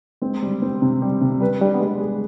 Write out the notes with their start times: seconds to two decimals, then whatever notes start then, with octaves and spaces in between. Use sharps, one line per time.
0.22 G#3 C4
0.43 G3
0.62 C4
0.82 C3
1.02 G3
1.21 C3
1.41 G3 B4
1.61 G3 D4
1.74 B3
1.80 G3 G#3
2.01 G#4